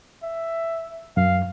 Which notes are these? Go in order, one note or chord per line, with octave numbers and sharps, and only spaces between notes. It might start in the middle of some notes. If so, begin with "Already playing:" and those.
E5
F#2 F5